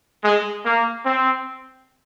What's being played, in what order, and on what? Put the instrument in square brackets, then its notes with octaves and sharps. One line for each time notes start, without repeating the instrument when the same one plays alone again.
[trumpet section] G#3
A#3
C4